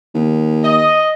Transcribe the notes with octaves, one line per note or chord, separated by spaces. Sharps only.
D#2
D#5